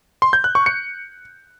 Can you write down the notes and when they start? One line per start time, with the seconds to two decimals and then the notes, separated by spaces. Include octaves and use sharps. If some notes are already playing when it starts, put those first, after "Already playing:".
0.22 C6
0.33 G6
0.44 F#6
0.55 C#6
0.66 C#7